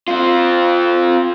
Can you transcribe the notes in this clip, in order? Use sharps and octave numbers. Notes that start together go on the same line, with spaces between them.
C4 F4